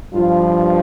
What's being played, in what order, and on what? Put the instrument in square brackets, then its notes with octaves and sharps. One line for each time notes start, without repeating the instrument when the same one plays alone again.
[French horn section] G2 F3 F4